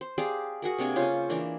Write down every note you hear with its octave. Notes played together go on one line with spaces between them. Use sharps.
C5
G4 G#4 D5 F5
F#4 G#4 A#4
C3 A#3 D4 G#5
C#3 C#4 F4 C5
E3 A#3 D4